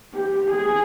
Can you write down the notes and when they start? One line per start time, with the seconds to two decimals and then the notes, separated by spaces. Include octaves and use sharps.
0.14 G4
0.51 G#4